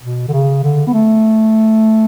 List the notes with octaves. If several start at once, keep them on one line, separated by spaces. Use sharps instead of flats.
B2
D3
C#3
D3
B3
A3